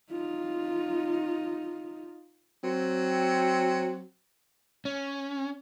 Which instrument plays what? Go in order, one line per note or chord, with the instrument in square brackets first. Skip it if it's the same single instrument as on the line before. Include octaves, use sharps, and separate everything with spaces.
[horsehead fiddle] D#4 F4
[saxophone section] F#3 C4
[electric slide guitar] C#4